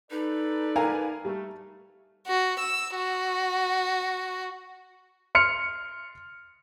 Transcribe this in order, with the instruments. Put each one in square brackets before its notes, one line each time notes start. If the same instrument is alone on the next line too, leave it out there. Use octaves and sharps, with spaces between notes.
[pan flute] D#4 [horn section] A4 B4 D5
[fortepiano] A#4 F5 A#5 [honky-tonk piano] G#5
[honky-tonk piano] G3 [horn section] A3
[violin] F#4
E6
F#4
[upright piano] C6 F6 C#7